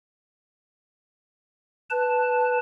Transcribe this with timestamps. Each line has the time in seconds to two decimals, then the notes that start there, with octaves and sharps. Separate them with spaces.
1.90 B4 A5